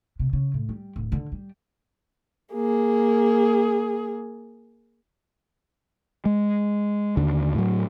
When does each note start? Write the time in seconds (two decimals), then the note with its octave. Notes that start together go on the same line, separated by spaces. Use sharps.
0.19 C3
0.33 C#3
0.54 A2
0.69 G3
0.96 D1
1.12 D3
1.32 G3
2.53 A#3 G#4
6.25 G#3
7.17 D#2 D3
7.55 A2 F#3